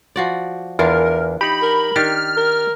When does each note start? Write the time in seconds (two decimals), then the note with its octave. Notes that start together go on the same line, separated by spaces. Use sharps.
0.16 F3 F#4 D5
0.79 E2 E3 D4 F4 A#4
1.41 D#4 G4 B5
1.62 A#4
1.96 D#3 D4 G4 F6
2.37 A#4